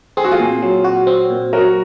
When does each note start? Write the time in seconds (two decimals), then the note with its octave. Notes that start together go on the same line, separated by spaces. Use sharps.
0.17 C4 G#4
0.24 F#4
0.32 F4 G#4
0.40 A#2
0.62 F#3
0.84 F#4
1.07 C4
1.30 A#2
1.53 F#3 F#4 A#4